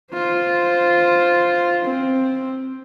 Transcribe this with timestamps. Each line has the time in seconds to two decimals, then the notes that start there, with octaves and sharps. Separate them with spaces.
0.13 F4 C5
1.85 C4